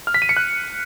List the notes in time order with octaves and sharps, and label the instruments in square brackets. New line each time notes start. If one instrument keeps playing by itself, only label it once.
[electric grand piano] F6
B6
D#7
C#7
F#6